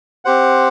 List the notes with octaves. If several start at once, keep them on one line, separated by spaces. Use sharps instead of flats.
C4 G4 C5 F#5